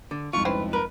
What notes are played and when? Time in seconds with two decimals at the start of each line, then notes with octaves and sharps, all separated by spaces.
0.11 D3
0.33 C2 F2 G#2 F4 C#6
0.45 C4 C#4 E4 B4
0.73 A#4 B4